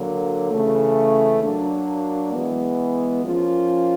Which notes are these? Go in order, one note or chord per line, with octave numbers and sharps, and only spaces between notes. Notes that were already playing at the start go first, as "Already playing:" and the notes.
Already playing: D3 F#3 A#3
C#3 E3 A3
F#3 A#3 D4
E3 G#3 B3
F3 A#3 C#4 F4